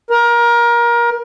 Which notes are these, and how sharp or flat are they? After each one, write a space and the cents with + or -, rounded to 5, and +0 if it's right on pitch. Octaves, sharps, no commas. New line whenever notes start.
A#4 +25